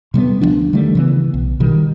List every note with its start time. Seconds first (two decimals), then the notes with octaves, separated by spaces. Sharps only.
0.14 C3 G3 G#3 B3
0.41 D2 F3 F#3 D4
0.73 D3 D#3 G3 A3
0.95 C#3 E3 B3
1.34 B1
1.60 B2 D#3 G3